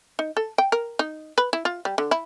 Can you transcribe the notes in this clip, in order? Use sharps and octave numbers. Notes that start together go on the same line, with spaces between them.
D#4
A4
G5
A#4
D#4
B4
E4
F4
G3
D3
E4